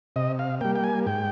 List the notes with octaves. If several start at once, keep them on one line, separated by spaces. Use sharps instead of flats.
C3 D#5
F5
G3 A#3 G5
G5
G#5
G#2 G5